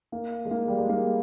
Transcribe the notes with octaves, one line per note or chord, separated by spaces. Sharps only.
A#3
G#3
A#3
G3
G#3
A#3